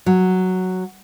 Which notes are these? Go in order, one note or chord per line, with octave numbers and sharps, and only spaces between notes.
F#3